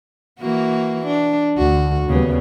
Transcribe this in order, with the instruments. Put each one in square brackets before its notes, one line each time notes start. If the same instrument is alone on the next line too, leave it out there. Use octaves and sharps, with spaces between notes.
[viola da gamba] E3 A#3 F#4
D4
[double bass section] D2 [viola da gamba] F#4
[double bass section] D#2 G3 B3 [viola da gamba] C#3